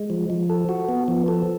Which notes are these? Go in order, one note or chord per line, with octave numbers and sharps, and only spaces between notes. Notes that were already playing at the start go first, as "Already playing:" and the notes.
Already playing: G#3
F3
F3
A4
F#4
B3
F3
A4